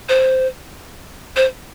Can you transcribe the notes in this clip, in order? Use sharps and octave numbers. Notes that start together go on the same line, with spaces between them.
C5
C5